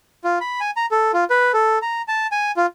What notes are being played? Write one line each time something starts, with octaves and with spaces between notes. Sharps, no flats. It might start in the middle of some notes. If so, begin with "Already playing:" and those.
F4
B5
G#5
A#5
A4
F4
B4
A4
A#5
A5
G#5
F4